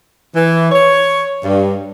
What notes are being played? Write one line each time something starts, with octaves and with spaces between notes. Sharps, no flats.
E3
C#5
G2